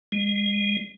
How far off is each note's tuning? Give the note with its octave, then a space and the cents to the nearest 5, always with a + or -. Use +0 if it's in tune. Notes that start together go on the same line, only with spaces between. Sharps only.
G#3 -30